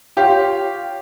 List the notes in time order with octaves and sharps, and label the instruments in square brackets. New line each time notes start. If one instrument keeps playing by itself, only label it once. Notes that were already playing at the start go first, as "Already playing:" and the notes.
[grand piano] F4 G4 C#5 F5